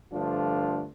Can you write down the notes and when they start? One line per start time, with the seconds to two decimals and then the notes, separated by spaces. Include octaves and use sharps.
0.11 G2 D3 F3 A3 D4 F4